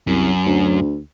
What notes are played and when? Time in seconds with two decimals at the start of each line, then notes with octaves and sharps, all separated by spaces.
0.07 C2 F#2
0.46 D2